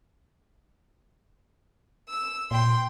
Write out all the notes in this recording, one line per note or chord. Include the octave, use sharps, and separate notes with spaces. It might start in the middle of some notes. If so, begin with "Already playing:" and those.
E6
A#2 G5 C6